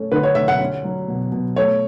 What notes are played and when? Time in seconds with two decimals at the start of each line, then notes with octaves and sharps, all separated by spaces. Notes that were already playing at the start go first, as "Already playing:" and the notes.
Already playing: A3 C#4
0.12 D3 B4
0.23 C#5
0.35 D3 E5
0.48 F#5
0.60 C#4
0.84 F#3
1.08 B2
1.32 B2
1.56 A3 C#5